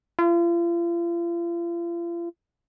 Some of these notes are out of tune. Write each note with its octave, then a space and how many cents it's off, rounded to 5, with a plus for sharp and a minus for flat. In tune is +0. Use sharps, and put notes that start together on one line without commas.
F4 -40